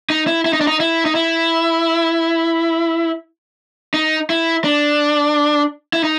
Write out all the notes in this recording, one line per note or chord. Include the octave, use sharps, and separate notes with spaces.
D#4
E4
E4
D#4
D4
D#4
E4
D#4
E4
D#4
E4
D4
E4
D#4